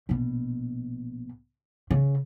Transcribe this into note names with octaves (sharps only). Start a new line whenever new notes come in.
A#1 B2
C#3